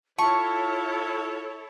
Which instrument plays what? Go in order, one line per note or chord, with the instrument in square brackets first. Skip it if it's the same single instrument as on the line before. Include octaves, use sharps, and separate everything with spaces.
[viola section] E4 A4 C#5 [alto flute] F4 [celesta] A5 [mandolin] C#6